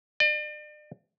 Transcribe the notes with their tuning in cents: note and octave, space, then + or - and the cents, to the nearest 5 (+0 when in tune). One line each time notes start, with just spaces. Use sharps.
D5 +40